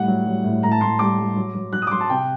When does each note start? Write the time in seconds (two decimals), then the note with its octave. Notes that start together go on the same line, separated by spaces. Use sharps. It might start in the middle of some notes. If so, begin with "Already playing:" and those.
Already playing: A2 G3 F#5
0.08 F#3
0.26 F#3
0.44 A2
0.63 A2 A#5
0.72 A5
0.81 A2 C6
0.99 G3 D6
1.18 G3
1.36 F#3
1.54 F#3
1.73 F#3 F#6
1.82 D#6
1.87 D6
1.91 F#3 C6
2.01 A5
2.10 C3 G5